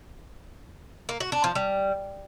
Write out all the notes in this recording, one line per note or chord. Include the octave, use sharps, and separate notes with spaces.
A#3
F#4
D4
F3
G3